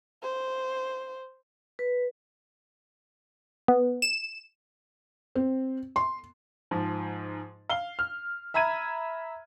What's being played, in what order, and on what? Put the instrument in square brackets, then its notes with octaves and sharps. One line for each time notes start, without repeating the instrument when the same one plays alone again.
[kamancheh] C5
[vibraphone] B4
[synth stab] B3
E7
[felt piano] C4
C6
[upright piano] G#2 F3
F5 G7
F6
E5 A#5 B5 G#6 D#7